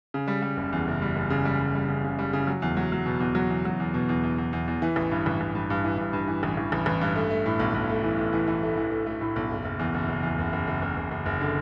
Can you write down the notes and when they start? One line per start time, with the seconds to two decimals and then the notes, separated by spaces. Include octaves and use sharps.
0.14 C#3
0.28 G3
0.42 G3
0.57 F#1
0.73 E2
0.87 F#1
1.02 G3
1.15 F#1
1.30 C#3
1.45 G3
1.60 G3
1.75 G3
1.89 C#3
2.04 C#3
2.19 G3
2.33 C#3
2.47 F#3
2.62 E2
2.77 F#3
2.92 F#3
3.06 B2
3.20 E2
3.35 F#3
3.50 E2
3.65 F#3
3.80 E2
3.94 B2
4.09 E2
4.23 E2
4.38 E2
4.53 E2
4.68 E2
4.82 E3
4.96 A1
5.11 G2
5.26 A1
5.41 A1
5.55 G2
5.70 G2
5.84 E3
5.98 G2
6.13 G2
6.28 E3
6.43 A1
6.57 A1
6.72 A1
6.86 A1
7.01 G2
7.16 A3
7.30 A3
7.46 A2
7.59 B1
7.74 B1
7.89 A3
8.03 E3
8.18 A2
8.33 E3
8.48 E3
8.63 A3
8.77 E3
8.91 A3
9.06 A3
9.21 A2
9.36 B1
9.51 F#1
9.65 F#1
9.79 E2
9.94 F#1
10.08 F#1
10.23 E2
10.38 F#1
10.53 F#1
10.67 F#1
10.82 F#1
10.97 F#1
11.11 F#1
11.26 F#1
11.41 D3